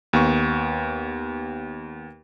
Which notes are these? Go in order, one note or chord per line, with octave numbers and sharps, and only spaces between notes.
D#2 B3 C#6